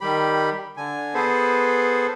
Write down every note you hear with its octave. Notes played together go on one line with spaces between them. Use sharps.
D#3 G3 G4 B5
D3 G#5
B3 G#4 A4 B4 C5